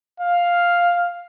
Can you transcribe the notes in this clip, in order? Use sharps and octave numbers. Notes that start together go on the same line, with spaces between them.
F5